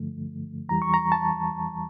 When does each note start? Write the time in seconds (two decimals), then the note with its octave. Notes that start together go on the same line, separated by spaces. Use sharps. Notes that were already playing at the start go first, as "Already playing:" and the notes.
Already playing: G2 D3 F3 A3
0.69 E2 E3 G3 A#5
0.82 C#6
0.94 A#5
1.12 A5